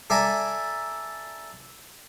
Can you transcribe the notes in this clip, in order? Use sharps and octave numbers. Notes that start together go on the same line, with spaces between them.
A4 D5 E5 G#5 A#5